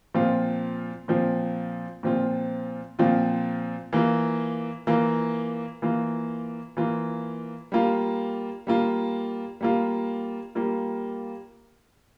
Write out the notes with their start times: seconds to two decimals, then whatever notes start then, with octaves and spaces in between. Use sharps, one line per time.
0.14 A#2 F3 C4 F4
1.08 A#2 F3 C4 F4
2.03 A#2 F3 C4 F4
2.99 A#2 F3 C4 F4
3.93 E3 A#3 F4
4.87 E3 A#3 F4
5.82 E3 A#3 F4
6.77 E3 A#3 F4
7.72 G3 A#3 F4
8.67 G3 A#3 F4
9.61 G3 A#3 F4
10.55 G3 A#3 F4